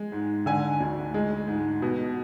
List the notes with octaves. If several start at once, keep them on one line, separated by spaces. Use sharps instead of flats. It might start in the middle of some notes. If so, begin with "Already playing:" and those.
Already playing: G#3
G#2
D3 G#5
D2
G#3
G#2
B2